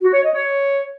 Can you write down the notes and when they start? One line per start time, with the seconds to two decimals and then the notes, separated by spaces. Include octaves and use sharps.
0.02 F#4
0.13 C#5
0.24 D#5
0.34 C#5